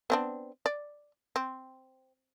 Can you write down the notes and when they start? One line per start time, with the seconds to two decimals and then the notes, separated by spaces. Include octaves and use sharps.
0.10 B3 C4 D4
0.66 D5
1.36 C4